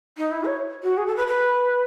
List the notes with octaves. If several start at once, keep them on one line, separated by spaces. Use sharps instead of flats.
D#4
E4
C#5
F#4
G#4
A4
B4
B4